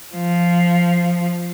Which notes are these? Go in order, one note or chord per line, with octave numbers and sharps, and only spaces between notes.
F3